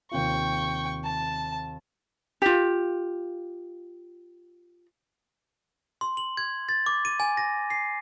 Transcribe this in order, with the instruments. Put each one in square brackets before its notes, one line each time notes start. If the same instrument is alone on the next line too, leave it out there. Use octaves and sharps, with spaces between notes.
[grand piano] D#2 C3 F4 [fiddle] G5 C#6
[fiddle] A5
[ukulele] F4 G4
[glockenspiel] C6
F#7
G#6
A6
D6
D#7
G#5
A#6
C7